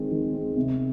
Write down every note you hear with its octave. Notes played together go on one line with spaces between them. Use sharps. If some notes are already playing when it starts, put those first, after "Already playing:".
Already playing: D#3 G#3 C4
D#3
G#3 C4
C3